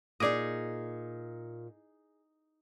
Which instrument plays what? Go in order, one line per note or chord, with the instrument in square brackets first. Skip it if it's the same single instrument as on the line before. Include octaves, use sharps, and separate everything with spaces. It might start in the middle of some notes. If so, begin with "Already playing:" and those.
[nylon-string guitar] A#2 [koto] D#4 G#4 D#5 [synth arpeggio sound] D5 D6 D#6